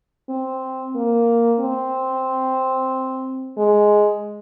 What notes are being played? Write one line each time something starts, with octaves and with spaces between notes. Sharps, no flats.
C4
A#3
C4
G#3